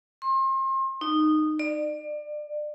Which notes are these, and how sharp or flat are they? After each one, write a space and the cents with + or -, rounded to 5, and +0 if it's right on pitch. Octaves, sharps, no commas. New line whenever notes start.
C6 +35
D#4 -15
D5 +30